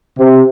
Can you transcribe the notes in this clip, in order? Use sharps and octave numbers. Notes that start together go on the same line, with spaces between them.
C3